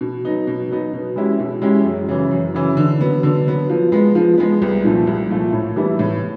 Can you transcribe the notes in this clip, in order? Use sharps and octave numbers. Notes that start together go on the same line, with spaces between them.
B2
F#3 B3 D#4
B2
F#3 B3 D#4
B2
G#3 C#4 E4 G4
B2
G#3 C#4 E4 G4
F#2
C#3 E3
F#2
C#3 E3
D3
F#3 B3
D3
F#3 B3
F3
G#3 B3
F3
G#3 B3
C2
A#2 F3 A3
C2
A#2 F3 A3
A2
E3 G3 B3 E4
A2